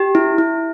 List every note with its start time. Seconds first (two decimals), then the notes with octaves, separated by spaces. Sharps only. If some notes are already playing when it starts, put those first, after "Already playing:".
Already playing: G4
0.15 E4
0.38 E4